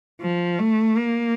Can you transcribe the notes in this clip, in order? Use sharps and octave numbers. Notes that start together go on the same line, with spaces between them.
F3
A3
A#3